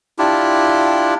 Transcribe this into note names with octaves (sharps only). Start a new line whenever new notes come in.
D4 E4 F4 G4